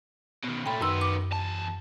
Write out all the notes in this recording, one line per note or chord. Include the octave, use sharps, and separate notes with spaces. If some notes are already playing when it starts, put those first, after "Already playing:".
B2 D#3
A#2 A3 G5 B5
F#2 D#3 B3 C6 E6
D6
E2 A5